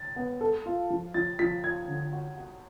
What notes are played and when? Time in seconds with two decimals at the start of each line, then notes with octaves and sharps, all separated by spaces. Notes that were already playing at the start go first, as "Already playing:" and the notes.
Already playing: A6
0.16 B3
0.41 A4
0.66 F4
0.90 F3
1.14 F3 A6
1.39 F3 B6
1.63 F4 G#6
1.88 D3
2.13 F#4
2.37 F#4